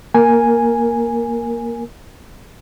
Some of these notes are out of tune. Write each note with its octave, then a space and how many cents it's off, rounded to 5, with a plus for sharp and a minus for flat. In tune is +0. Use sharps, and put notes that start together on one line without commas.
A#3 +10 A#4 +0 G#5 +0